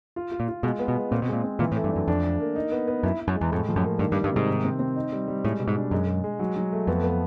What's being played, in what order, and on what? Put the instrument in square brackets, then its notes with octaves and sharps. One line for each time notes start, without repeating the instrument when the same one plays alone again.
[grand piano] F4
F4
[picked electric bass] A#2
[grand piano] F4
[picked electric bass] B2 [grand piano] G#3
[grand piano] B3
[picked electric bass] B2
[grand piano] G#3
[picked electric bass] A#2 [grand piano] C4
[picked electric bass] B2
[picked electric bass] A#2 [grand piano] G#3
[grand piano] C4
[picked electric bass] A#2 [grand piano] E3
[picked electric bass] A2
[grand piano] A3
[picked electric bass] G2
[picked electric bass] F#2 [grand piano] D4
[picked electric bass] F2 [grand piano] D4
[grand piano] D4
A#3
D#4
B3
B3
[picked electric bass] F#2 [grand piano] E4
[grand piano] E4
[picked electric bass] F#2
[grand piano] G#3
[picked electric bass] E2
[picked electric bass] F2 [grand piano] A2
[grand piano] F3
[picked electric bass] F#2
[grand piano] A#3
[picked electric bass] G2 [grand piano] D#3
[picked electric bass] G2
[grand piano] G3
[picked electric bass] G2
[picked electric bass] G#2 [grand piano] C3
[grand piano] D#3
C4
C4
D#4
G3
G3
[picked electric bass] A2 [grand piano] G#3
[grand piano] B2
[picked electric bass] G#2
[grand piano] D4
[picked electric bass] F#2 [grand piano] G#3
[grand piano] G#3
G#3
F#3
F#3
A3
[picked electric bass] F2 [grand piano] B3
[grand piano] B3